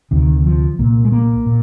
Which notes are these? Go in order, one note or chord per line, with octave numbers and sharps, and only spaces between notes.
D2 C3 D#3
F3
C2 A#2 A#3
G#3
A#3
A#2